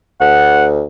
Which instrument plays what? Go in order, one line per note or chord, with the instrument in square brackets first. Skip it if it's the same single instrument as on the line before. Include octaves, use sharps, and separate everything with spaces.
[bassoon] D2 [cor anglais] F#5